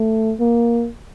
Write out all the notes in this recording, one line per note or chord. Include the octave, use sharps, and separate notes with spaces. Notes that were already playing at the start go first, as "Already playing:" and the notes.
Already playing: A3
A#3